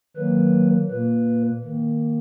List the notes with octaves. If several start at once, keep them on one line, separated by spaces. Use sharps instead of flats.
D#3 F#3 A#3 B4
A#2 A#3 B4
D#3 A#3